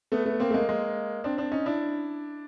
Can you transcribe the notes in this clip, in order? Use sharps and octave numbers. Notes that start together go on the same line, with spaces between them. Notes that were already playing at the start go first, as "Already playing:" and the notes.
A3 B3
A3 B3
A#3 C4
A3
G#3 A#3
G#3 A#3
C4 D4
C4 D4
C#4 D#4
D4 E4